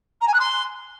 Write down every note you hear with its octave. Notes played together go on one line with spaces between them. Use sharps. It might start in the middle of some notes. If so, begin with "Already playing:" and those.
A#5
G#5
F#6
C6